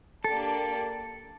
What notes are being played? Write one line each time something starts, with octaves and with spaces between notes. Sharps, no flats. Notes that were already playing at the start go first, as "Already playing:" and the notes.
A#3 D4 G4 A4 D5 A5